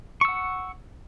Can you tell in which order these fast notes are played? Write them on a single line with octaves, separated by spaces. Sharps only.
C#6 E6 F#5